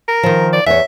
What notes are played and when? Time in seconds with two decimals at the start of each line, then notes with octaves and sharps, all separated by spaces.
0.08 A#4
0.23 D#3 F3
0.53 D5
0.66 E2 C#5 E5